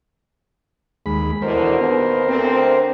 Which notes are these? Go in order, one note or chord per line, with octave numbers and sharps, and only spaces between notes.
D#2 G#3 B5
B2 D3 E3 A#4 C5
D#2 B3
D2 C4